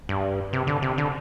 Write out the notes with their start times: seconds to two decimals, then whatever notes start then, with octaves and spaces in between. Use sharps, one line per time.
0.09 G2
0.53 C3
0.67 D3
0.82 C3
0.98 D3